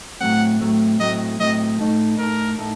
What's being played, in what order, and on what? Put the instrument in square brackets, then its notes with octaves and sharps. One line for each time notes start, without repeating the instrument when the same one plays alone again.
[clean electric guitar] A2 F#3 A3 C4 [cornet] F#5
[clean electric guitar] A2 F#3 A3 C4
[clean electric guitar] A2 F#3 A3 C4 [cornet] D#5
[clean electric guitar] A2 F#3 A3 C4 [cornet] D#5
[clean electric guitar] A2 A3 D#4 A4
[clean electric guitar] A2 A3 D#4 A4 [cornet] A#4
[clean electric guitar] A2 A3 D#4 A4